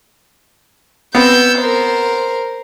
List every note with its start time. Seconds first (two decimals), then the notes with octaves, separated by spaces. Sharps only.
1.15 B3 C4 E6 G6
1.59 A#4 C5